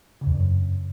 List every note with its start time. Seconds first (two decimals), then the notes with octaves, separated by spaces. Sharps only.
0.21 C#3
0.27 E2
0.32 G2
0.37 F#2